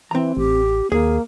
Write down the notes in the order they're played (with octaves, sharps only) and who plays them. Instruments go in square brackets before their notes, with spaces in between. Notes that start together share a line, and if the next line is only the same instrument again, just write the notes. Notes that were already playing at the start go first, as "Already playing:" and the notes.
[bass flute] E3 [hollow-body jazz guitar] C4 A#5
[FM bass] A1 [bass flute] G4
[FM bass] D#2 [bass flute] A#3 [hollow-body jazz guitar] G#4